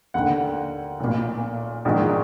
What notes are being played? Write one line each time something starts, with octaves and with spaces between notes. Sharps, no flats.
D#2 D3 F#5
B1 A#2
A#1 G#2 D#3